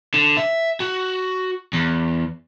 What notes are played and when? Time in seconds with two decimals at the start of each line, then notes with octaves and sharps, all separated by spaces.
0.14 D3
0.37 E5
0.80 F#4
1.73 E2